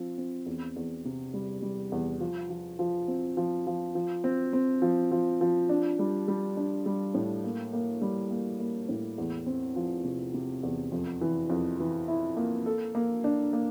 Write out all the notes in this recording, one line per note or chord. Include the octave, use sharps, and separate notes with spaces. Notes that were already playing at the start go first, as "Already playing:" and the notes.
Already playing: F3 C4
C4
E2
E2
C3
G3
G3
E2
F3
F3
F3
C4
F3
F3
F3
C4
C4
F3
F3
F3
D4
G3
G3
D4
G3
A2
A#3
A#3
G3
A#3
A#3
A2
E2
C4
F3
C3
C3
E2
F2
E3
F2
E3
E4
A#3
A4
A#3
D4
A#3